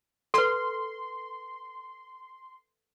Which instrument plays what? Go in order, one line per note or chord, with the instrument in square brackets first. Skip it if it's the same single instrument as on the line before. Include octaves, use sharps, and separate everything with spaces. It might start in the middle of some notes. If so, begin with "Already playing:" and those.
[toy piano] A4 B4 [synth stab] C6